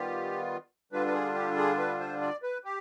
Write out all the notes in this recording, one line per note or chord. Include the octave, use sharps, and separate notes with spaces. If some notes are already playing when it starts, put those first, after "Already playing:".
Already playing: D#3 G3 B3 F4 G4
D3 G3 D4 F4 B4
B4
G#4
G4
G#4
B4
C5
D5
B4
G4